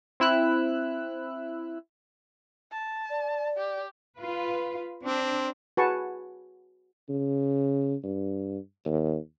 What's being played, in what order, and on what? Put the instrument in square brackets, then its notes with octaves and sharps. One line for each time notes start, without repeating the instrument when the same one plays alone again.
[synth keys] C4 E4 E6 F#6
[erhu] A5
[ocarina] D5
[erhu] G4
[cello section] F4 B4
[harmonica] C4 [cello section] D4
[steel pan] F#4 G#4 B4 G#5 A5 C#6
[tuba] C#3
G2
D#2